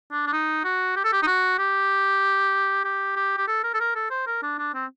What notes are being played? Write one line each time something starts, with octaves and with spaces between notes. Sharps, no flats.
D4
D4
D#4
F#4
G4
A4
G4
D#4
F#4
G4
G4
G4
G4
A4
A#4
A4
A#4
A4
C5
A#4
D4
D4
C4